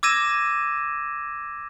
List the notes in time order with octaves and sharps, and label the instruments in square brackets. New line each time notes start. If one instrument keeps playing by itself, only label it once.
[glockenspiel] D6 E6 G#6 A#6 D#7 E7